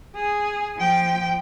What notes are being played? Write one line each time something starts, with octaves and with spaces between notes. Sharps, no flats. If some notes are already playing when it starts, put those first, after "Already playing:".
G#4
F3 G5